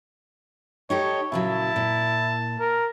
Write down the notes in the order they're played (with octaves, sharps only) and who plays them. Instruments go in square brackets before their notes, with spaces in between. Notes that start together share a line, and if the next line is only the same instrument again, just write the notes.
[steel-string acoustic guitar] D#4 G4 A4 [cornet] C#5
[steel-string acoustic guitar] A#2 C#3 F#3 [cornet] E4 [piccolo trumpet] A5
[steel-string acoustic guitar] A#2
[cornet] A#4